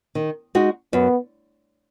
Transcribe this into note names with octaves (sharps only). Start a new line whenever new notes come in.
D#3
G#3 D#4 F#4
F#2 B3